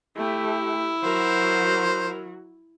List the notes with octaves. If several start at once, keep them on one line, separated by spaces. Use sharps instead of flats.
A3 E4 G4
F#3 F#4 A#4 C5